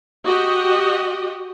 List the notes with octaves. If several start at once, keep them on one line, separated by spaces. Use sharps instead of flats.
F#4 G4 D#5